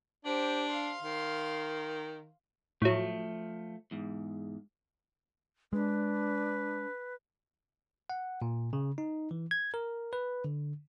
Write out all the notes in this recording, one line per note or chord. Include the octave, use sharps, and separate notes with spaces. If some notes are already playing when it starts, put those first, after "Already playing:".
D4 G4 C5
F5 C6
D#3
A2 F3 F#3 A3
E2 G#2
G#3 D4 B4
F#5
A#2
C#3
D#4
E3
G#6
A#4
B4
D3